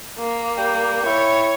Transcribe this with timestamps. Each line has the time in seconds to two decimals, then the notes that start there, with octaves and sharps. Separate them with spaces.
0.18 A#3
0.58 G3 G5
1.06 E4 C#5